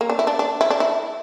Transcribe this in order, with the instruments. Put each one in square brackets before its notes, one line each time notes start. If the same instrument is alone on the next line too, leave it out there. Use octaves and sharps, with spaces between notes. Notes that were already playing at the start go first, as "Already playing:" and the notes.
[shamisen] A#3
D4
E4
D4
D4
E4
D4
E4